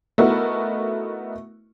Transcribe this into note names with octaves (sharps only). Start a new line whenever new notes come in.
A3 B3 D#4 E4 F#4 A#4